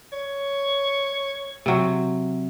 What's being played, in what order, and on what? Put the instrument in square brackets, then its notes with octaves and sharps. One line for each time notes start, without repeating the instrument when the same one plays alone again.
[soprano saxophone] C#5
[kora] C3 F#3